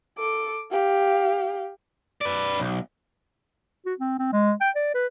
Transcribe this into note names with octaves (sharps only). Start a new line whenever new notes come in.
A4 D6
G4 F5
B4 D5
B1
F#4
C4
C4
G#3
G5
D5
B4